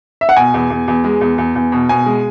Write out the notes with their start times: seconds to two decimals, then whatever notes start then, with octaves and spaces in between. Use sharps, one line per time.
0.21 E5
0.29 F#5
0.36 B2 G#5
0.54 E2
0.70 E2
0.88 E2
1.04 G#3
1.21 E2
1.38 E2
1.55 E2
1.72 B2
1.89 B2 G#5
2.06 G#3